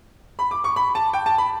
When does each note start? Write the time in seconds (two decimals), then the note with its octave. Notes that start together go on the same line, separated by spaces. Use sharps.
0.39 B5
0.51 D6
0.64 C#6
0.76 B5
0.95 A5
1.13 G5
1.26 A5
1.38 B5